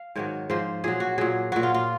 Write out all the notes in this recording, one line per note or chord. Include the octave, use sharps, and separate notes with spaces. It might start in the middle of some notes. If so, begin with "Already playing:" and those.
Already playing: F5
G#2 D#3 F#3 C#5
G#2 F3 C5
A#2 F#3 G#4
F#4
A#2 F#3 G#4
A#2 F#3 F#4
F4
F4